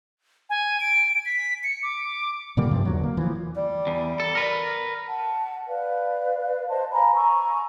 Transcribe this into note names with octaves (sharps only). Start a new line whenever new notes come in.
G#5
D7
B6
C#7
D6
A#2 D3 G3 A#3
G2 C3 F3
E2 D3 F#3
A#3
E3 F3
G3
E2
A4
A#4 B4
F#5 A5
B4 D5 F5
C5 D#5 A5 C6
F5 G#5 A#5 B5
G#5 A#5 C#6 E6